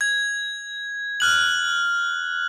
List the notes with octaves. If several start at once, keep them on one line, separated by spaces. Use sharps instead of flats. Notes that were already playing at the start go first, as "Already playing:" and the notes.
G#6
F6 F#6 F#7